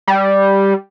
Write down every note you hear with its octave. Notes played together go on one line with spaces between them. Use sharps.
G3